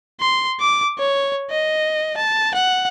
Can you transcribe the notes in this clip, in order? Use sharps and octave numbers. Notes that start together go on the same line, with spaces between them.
C6
D6
C#5
D#5
A5
F#5